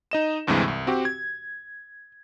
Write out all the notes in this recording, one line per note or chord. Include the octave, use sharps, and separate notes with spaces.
D#4 D#5 E7
D2 G2 C3 E3 G#3
C2
C4 F#4 G4
G#6